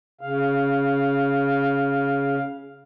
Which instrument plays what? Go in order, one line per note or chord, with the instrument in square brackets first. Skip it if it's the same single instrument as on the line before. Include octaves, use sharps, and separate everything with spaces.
[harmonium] C#3 F5